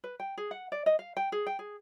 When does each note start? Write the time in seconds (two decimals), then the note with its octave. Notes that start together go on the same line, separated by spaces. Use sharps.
0.04 B4
0.20 G5
0.38 G#4
0.51 F#5
0.72 D5
0.86 D#5
0.99 F5
1.17 G5
1.32 G#4
1.47 G5
1.59 G#4